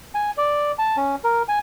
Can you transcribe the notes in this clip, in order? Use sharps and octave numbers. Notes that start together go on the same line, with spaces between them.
G#5
D5
A5
C#4
A#4
G#5